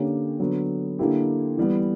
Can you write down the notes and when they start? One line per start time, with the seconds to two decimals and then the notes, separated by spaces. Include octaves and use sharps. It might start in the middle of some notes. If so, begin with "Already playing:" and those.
Already playing: D3 A#3 C#4 G4 A#4
0.40 D3 F#3 B3
0.99 D3 A#3 E4 G4
1.57 E3 G3 B3